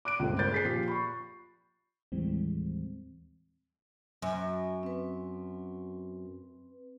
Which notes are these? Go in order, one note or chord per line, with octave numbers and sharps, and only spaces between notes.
D6 F#6 D7
C#2 G2 A#2 A3 C4
A#4 C5 F#6 G6 A6
G#4 B6 C7
A#2 F3 F4 G4
B5 C#6
D#2 A2 E3 G3 G#3 C4
F#2 G#5
C4 B4